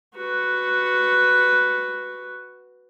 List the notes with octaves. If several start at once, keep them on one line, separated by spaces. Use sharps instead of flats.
F#4 B4